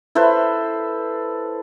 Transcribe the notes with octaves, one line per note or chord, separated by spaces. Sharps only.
E4 A4 B4 C5